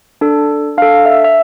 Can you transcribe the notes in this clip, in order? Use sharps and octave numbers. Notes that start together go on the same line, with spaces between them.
D4 A4
D4 A4 F5
E5
E5